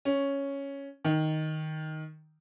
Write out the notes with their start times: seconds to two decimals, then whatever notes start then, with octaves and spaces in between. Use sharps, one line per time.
0.05 C#4
1.05 D#3